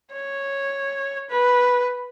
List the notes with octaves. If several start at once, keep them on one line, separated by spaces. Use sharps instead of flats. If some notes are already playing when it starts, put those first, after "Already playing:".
C#5
B4